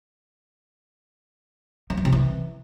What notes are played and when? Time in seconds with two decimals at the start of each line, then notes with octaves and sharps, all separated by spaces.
1.90 F3
1.97 F#3
2.05 C3
2.12 E3